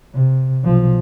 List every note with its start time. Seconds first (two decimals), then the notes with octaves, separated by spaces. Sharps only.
0.14 C3
0.64 B1 F3